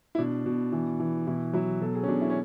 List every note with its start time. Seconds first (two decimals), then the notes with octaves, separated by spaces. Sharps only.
0.15 E4
0.18 B2 D4
0.46 B2
0.72 E3
1.00 E3
1.27 B2 E4
1.53 F#3 E4
1.81 B2 A4
1.95 G#4
2.03 C#4
2.08 B2 D4
2.21 E4
2.30 C#4